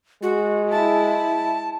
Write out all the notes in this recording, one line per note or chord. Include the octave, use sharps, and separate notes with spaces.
G#3 F#4
E4 A5